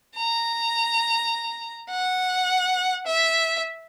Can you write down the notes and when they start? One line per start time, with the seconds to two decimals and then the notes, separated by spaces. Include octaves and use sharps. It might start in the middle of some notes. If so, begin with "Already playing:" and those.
0.16 A#5
1.90 F#5
3.07 E5